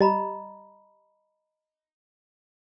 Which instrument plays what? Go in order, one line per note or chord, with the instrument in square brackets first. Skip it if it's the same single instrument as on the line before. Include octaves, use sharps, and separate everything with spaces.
[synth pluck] G3 [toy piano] D#5 A#5 B5